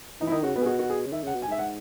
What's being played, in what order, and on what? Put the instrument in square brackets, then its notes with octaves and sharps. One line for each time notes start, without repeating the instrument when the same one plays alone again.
[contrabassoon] E3 [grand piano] D#4
[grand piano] E4
[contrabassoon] D#3 [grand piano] D#4
[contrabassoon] C#3 [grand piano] F#4
[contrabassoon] B2 [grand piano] B3
[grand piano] G#4
[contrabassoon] B2 [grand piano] F#4
[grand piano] F#4
G#4
[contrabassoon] C#3
[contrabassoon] D#3 [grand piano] E5
[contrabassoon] C#3 [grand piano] F#5
[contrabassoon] B2
[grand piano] G#5
[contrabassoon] G#2 [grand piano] E5
[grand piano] F#5